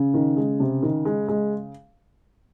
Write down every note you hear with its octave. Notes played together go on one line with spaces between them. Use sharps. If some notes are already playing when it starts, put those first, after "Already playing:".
Already playing: C#3
D#3
G#3
C3
D#3
G#3
G#3